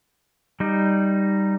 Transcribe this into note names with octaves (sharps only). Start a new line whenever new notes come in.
G3 D#4